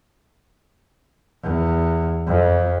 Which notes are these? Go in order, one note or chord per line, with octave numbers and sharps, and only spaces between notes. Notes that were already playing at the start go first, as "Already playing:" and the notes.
E2
F2